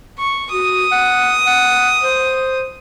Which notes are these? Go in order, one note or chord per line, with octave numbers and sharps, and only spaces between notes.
C#6
F#4 D#6
F#5
F#5
C5